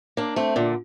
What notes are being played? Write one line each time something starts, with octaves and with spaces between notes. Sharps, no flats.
A#3 D4
A3 C4
A#2 D3